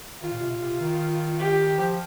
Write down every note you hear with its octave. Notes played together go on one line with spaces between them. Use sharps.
D#3 F4
A#2
C3
A#2
C3
D#3
G4
F3